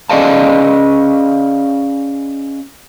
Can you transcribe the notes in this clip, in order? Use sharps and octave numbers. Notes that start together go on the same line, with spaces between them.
C#4 G#4 D5 D#5 F5 A5